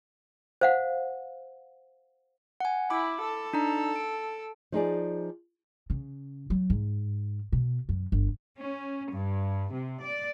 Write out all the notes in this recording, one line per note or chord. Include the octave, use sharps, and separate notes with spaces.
C5 F5 F#5
F#5 G#5
E4 B5 D6
A4
D4 D#4 A#5
D7
F3 D#4 G#4 D5
C#3
F#3
G#2
B2
F#2
G1
C#4
G2
C3
D5